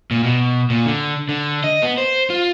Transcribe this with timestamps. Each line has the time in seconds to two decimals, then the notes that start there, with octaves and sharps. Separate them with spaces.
0.11 A#2
0.24 B2
0.70 A#2
0.86 D3
1.29 D3
1.64 D#5
1.83 B3
1.98 C5
2.30 F4